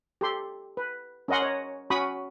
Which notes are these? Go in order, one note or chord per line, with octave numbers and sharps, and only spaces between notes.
G4 A4 C6
B4
C#4 A#4 D#5 F#5 C6
C#5 D#5
C#4 F#4 B5 C#6 D#6